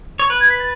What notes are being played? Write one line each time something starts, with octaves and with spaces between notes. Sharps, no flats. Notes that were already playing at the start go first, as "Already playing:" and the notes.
C#5
B4 F#6
G#6
B6
A6